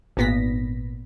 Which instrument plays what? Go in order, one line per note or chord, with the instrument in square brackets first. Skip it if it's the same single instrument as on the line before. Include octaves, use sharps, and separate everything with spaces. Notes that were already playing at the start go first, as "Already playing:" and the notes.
[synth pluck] G#1 A#2 B3 A#6 B6